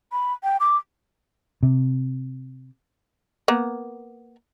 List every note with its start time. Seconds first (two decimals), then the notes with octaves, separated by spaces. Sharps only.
0.12 B5
0.43 G5
0.60 D6
1.63 C3
3.48 A#3 B3